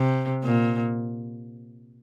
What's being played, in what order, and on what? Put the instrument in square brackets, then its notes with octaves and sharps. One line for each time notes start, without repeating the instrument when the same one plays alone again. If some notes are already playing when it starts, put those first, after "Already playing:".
Already playing: [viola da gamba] C3
A#2